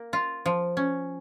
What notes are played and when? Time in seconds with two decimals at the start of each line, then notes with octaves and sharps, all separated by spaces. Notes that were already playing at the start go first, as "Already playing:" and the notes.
Already playing: A#3
0.13 F4
0.46 F3
0.77 C#4